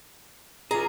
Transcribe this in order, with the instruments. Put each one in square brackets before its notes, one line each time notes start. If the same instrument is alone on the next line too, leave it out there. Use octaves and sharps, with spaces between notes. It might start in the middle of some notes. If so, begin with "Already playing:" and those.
[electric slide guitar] F4 G#4 [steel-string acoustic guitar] A#5